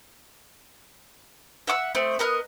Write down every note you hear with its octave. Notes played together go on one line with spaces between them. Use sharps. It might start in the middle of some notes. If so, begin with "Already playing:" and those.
E5 F#5 D6 E6
A3 C4 D#5
B3 A#4 D#5 F#6